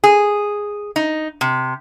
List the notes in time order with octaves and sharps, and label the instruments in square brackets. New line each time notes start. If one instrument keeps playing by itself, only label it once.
[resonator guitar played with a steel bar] G#4
D#4
C3